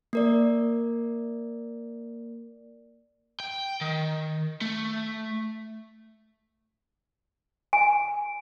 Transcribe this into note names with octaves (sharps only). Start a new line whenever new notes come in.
A#3 A#4 D5
G5
D#3
A3
G#5